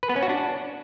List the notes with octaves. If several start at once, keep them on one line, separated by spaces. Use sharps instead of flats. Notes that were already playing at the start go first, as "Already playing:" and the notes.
B4
B3
C#4
F#4
D4